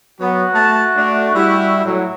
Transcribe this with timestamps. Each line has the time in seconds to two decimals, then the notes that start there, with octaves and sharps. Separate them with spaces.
0.20 F#3 B3 F#4
0.54 A3 A5
0.95 A3 D4
1.34 G3 E4
1.84 A2 F#3